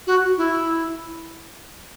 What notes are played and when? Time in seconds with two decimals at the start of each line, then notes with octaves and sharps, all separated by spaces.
0.07 F#4
0.37 E4